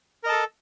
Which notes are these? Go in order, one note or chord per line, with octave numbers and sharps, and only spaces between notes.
A4 A#4 D#5 A5